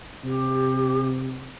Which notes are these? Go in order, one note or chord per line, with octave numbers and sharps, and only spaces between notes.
C3 G4